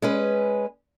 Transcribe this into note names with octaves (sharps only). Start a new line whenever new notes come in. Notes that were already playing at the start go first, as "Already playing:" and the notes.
G#3 C#4 B4